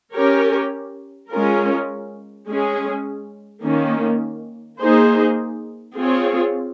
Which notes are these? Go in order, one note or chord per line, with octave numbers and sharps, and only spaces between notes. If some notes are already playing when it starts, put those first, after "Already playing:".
C#4 G4 A#4 C#5
G#3 C#4 F4 A#4
G#3 C#4 G#4
D#3 A#3 C#4
A#3 D#4 G#4 C5
C4 F4 G#4 C#5